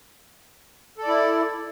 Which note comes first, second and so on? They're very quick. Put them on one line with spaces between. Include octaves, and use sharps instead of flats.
A4 D5 E4